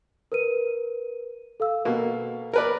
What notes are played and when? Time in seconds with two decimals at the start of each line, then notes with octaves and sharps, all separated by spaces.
0.32 A#4 B4 D#7
1.60 A4 F5 E6
1.85 B2 A#3
2.53 A#4 B4 D5